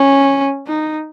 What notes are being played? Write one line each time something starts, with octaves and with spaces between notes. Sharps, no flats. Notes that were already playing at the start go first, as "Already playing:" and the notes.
Already playing: C#4
D#4